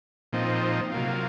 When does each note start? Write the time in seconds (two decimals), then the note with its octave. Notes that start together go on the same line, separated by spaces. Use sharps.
0.33 A#2 F3 C4 D#4
0.92 C3 F#3 A#3 F4